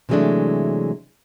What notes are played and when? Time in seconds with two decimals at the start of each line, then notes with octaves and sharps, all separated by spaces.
0.09 C3 E3 F#3 G#3 A3 D4